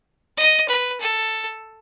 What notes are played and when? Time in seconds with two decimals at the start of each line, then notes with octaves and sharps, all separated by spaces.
0.37 D#5
0.69 B4
1.00 A4